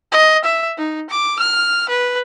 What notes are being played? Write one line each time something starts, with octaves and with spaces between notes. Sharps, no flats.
D#5
E5
D#4
D6
F6
B4